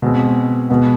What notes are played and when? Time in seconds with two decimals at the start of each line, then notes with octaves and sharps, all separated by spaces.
0.02 B2 G#3 C4
0.70 B2 G#3 B3